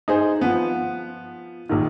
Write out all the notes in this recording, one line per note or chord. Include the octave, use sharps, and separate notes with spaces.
D#4 G#4 C5
F3 B3
A#1 D#3